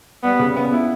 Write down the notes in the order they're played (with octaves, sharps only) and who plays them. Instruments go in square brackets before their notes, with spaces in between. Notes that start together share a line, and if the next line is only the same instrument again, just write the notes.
[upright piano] G3 [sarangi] B3
[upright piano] C#3
B3
E4